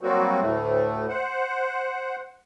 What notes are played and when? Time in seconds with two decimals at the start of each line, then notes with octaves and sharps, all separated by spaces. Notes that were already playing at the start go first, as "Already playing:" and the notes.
0.01 F#3 G3 A#3 C4 F#4
0.40 D2 A2 A3
1.09 C5 F#5